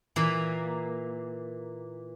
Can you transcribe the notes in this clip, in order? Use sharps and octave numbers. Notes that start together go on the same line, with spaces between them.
A#2 E3 A#3